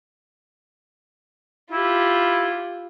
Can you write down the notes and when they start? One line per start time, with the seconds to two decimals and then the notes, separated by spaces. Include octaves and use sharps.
1.72 E4 F4 G4